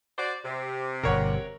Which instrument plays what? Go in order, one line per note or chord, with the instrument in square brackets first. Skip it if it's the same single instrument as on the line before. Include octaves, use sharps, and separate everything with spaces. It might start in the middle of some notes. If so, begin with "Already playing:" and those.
[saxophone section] F#4 C5 D5
C3
[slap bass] G1 B2 [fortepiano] A#4 C#5 F#5